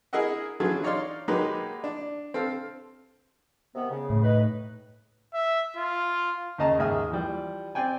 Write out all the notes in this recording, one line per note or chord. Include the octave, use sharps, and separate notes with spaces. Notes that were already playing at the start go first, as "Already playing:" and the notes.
E4 G#4 A#4 D#5 E5 F#5
E3 F#3 C#4 F4 G#4 A4
D#4 C#5 D5 F5 C6
F#3 G#3 A#3 D#4 G4 B4
D4
C4 A4 F5
C3 D#3 B3
C#3
A2
D#4 B4
E5
F4
D#2 C#3 D#5 A5 A#5
D#2 G#2 G#4 E5 D#6 F6
E3 F3 G3
C4 D5 G5 G#5